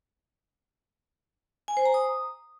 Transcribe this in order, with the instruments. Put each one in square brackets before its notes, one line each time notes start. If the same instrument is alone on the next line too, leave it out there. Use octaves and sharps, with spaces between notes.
[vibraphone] G#5
C5
A#5
D#6